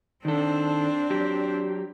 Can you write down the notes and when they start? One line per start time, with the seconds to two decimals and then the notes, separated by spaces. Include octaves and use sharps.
0.25 D#3 C4 D4 A4
1.10 F#3 G4